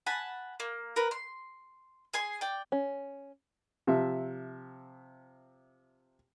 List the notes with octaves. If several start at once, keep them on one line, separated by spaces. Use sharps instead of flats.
F#5 G#5 A5 B5
A#3
A#4 B4
C6
G#4 G#5 C6
D5 G5
C#4
C3 F3 E5